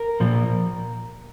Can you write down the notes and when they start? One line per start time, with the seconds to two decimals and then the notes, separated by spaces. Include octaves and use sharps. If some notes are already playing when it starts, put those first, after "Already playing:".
Already playing: A#4
0.20 A#2 F3